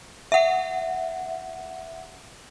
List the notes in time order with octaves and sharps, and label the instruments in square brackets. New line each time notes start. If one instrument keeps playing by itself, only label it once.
[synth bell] E5 F#5